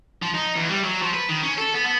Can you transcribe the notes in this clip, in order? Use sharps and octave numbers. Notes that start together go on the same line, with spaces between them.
F3
D#4
E2
G3
F#3
F3
B4
D#3
C#4
A4
B3
B3